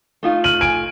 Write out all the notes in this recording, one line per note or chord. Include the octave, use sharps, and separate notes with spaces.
A3 D#4 F4
F6 D#7 F#7
G#5 D7